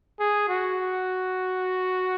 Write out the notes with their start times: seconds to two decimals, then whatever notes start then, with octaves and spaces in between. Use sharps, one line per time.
0.20 G#4
0.48 F#4